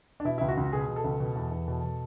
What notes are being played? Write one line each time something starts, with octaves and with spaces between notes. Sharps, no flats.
D4
B2 E4
C#2 E4
F#4
C#2
B2 G#4
B2
A4
C#2
B2
E2
E2
B2
B2